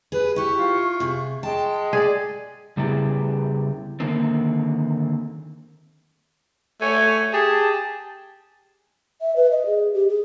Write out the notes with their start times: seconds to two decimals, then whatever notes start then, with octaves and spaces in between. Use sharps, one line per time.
0.12 G#4 B4
0.36 E4 G4 C#6
0.56 F4
1.00 C3 G#4
1.43 G#3 G5 A5
1.93 G#4 D5
2.77 C#3 G3 B3 E4 G4 G#4
4.00 D3 D#3 A#3 C4
6.81 A3 C#5 G#5
7.33 G4 G#4 A5
9.21 E5
9.36 B4
9.51 D#5
9.66 G#4
9.93 G4
10.09 G#4